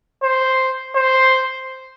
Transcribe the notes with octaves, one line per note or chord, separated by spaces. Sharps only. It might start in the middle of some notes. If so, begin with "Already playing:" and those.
C5
C5